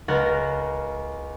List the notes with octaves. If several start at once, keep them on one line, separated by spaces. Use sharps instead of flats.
C#2 A#4 F#5 A#5 F#6 A6